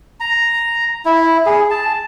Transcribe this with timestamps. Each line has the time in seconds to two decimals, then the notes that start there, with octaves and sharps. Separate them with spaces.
0.20 A#5
1.05 E4
1.46 G#4
1.70 A5